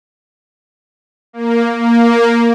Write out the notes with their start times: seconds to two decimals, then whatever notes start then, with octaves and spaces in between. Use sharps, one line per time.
1.33 A#3
1.80 A#3